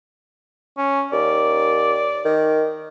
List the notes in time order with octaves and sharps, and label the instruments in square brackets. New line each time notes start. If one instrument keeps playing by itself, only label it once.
[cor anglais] C#4
[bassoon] D#2 [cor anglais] D5
[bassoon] D#3